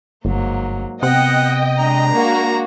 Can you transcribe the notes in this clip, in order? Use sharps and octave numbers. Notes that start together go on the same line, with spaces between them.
G1 G#2 F#3 A#3
C3 B3 D#5 F#5 G5
G#3 D4 A#5
A#3 F#4